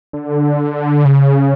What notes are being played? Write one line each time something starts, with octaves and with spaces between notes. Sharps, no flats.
D3
C#3